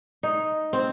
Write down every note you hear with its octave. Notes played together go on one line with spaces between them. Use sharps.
D#4
C4